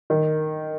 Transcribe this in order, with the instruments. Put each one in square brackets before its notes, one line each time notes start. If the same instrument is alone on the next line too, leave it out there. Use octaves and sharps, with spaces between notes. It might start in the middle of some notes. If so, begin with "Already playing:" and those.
[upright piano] D#3